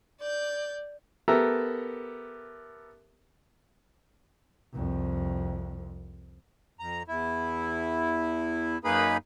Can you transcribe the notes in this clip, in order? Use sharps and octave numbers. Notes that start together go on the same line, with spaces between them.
D5 G6
B3 G4 A4 A#4 E5 A#5
C2 F2
F2 A#5
E2 E4
F#2 A#3 D#4 G#4 B4 B5